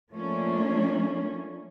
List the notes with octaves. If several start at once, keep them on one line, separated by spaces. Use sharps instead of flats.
F3 A3 A#3 C#4 D4